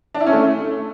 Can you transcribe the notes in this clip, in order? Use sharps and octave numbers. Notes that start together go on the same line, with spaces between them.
D4
E4
C#4
A3